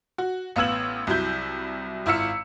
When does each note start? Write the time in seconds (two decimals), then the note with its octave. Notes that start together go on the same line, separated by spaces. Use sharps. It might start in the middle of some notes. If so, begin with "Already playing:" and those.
0.18 F#4
0.56 A1 B3 F5 E6 G#6 F#7
1.07 C2 F#3 E4 G6
2.06 G#1 E4 F4 F5 E6 C#7